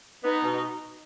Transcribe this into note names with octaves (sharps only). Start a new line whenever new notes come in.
B3 D#4
B2